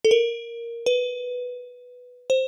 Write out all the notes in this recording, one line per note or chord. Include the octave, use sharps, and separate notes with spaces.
A4
A#4
B4
C5